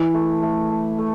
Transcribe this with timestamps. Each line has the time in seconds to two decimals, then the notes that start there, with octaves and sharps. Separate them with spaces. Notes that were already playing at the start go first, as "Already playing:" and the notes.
Already playing: E3
0.14 A3
0.43 A3
0.70 A3
0.98 A3